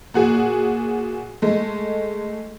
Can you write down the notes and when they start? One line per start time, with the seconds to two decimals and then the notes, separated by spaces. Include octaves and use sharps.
0.14 A#2 F#4 G#4
1.42 G#3 A3